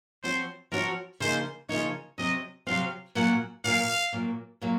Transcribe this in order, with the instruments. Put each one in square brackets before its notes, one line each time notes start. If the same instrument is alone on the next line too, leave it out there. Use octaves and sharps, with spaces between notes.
[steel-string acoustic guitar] F3 C4 F#4 C#5 [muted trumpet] C5
[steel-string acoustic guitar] F3 C4 F#4 C#5 [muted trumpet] A#4
[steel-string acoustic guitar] C#3 F3 A#3 D#4 [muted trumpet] C5
[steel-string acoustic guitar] C#3 F3 A#3 D#4 [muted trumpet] C#5
[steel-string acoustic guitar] C3 F#3 C4 [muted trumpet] D#5
[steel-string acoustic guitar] C3 F#3 C4 [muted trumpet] F5
[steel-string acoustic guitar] A#2 F#3 A#3 C#4 [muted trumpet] F#5
[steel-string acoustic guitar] A#2 F#3 A#3 C#4 [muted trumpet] F5
[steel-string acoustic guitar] A#2 F#3 A#3
A#2 F#3 A#3